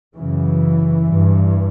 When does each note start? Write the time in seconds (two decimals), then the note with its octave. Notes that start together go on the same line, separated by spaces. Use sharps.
0.15 F#2 C#3 E3
1.07 G2